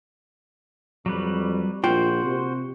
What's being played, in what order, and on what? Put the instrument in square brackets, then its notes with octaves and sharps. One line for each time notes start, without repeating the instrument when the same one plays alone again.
[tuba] F2 [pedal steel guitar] F#3 G3 B4
[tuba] A#1 [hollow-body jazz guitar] F4 G5 [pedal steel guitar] F#4 C5
[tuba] C3